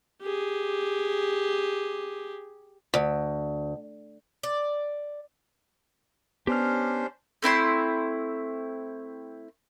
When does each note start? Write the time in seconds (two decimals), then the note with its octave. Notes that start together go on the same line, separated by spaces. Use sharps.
0.22 G4 G#4
2.94 D2
4.43 D5
6.47 B3 C#4 D4 G4 C5 F6
7.42 A3 C4 E4 C6